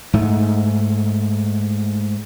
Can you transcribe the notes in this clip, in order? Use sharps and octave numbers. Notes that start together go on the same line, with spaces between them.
G#2 A3